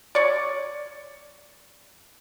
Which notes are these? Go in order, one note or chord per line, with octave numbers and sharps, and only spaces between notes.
C#5 D5